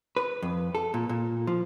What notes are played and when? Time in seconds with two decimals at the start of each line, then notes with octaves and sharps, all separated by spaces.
0.17 B4
0.42 F2
0.75 A4
0.94 A#2
1.09 A#2
1.47 F3